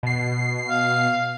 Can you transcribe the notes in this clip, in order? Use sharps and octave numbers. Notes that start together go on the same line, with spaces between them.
B2 C7
F5